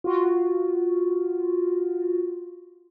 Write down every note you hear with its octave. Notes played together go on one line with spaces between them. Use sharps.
F4 F#4